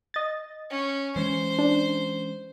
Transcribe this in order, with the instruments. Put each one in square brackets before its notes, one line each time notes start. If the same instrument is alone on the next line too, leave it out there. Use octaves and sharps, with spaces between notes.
[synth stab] D#5 A6
[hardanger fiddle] C#4
[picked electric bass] E3 G#3 C#4 [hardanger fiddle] C5
[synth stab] D4